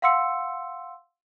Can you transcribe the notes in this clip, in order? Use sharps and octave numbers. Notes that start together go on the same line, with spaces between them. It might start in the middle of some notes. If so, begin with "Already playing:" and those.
F5 F#5 C6 E6 C#7